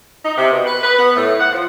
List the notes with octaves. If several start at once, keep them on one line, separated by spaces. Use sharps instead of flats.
D#4
C3
B2
B4
B4
B3
A2
F#5
F3